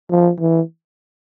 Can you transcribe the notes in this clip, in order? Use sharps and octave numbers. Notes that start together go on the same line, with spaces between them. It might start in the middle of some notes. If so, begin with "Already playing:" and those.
F3
E3